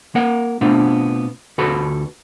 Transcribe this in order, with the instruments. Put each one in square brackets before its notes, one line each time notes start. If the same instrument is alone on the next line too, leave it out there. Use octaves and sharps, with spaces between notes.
[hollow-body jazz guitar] A#3 A#4 F#5
B2 A3 B3 C4 D4 F4
D2 F4 F#4 A4 B4 B5